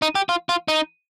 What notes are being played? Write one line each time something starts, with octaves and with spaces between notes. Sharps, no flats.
D#4
G4
F4
F4
D#4